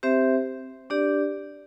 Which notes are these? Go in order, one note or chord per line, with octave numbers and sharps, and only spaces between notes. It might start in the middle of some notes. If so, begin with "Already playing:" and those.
C4 G4 C5 E5
D4 G4 D5